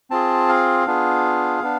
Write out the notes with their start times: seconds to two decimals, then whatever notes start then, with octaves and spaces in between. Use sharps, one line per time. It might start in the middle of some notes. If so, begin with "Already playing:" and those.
0.10 C4 F4 G#4 A5
0.49 F5
0.87 B3 D4 F4 G#4
1.62 B3 D4